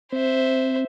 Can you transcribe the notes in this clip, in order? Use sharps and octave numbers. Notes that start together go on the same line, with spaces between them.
C4 C5 E5